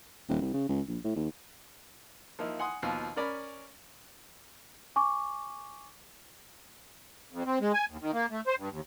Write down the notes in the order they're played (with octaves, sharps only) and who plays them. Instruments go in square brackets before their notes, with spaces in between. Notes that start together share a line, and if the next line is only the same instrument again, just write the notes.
[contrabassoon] D#1
C2
C#3
C#2
A#1
A2
D#2
[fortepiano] F3 A#3 D#4 E4
F#5 G#5 C6 D#6
D#2 B2 F3
C#4 A#4 D5 B5
[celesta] G#5 C#6 D6
[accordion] F2
C4
G#3
G#5
D#2
D#3
A#3
A3
C5
G2
D#2